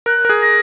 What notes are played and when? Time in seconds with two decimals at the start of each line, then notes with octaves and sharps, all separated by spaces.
0.06 A#4 F#6
0.25 A#4
0.30 G#4
0.42 A#6